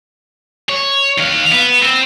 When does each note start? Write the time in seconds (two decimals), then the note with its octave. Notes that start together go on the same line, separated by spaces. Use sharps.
0.69 C#5
1.18 D#3 F5
1.52 B3
1.82 C4